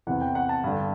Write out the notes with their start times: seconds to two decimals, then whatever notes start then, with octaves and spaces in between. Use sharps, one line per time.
0.07 E2 C3 E3 F#5
0.21 G5
0.35 F#5
0.49 A5
0.64 G2 D3